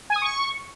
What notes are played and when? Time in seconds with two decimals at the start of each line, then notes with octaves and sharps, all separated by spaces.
0.10 G#5
0.16 D#6
0.22 C#6